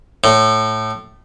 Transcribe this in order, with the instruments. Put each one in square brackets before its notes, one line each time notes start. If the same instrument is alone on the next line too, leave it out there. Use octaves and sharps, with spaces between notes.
[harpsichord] A2